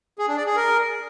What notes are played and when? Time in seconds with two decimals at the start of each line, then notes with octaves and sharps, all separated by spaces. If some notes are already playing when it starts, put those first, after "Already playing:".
0.19 G#4
0.28 D4
0.37 D5
0.47 G#4
0.56 A#4